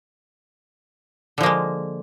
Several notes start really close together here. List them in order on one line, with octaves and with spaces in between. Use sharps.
D3 F3 A#3 G#3